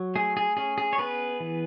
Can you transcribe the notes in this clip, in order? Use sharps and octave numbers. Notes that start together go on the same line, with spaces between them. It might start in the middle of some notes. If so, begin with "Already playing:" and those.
Already playing: F#3
A3 G#4
G#4
C#4 G#4
G#4
C#5
B3 G#4 B4
E3